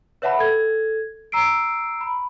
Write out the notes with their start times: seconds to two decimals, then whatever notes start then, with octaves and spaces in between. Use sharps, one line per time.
0.22 B4 C#5 E5 F#5 A5 B5
0.39 A4 G#6
1.32 A#5 E6 C7 D7
2.01 B5